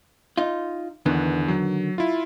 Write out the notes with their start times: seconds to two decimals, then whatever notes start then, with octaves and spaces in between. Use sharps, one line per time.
0.37 D#4 F4
1.06 E2 D3 D#3 B3
1.48 F#3
1.98 E4 F4